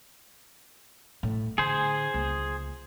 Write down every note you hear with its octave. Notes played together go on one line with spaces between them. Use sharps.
A2
D3 G#4 C5
C#2 A#3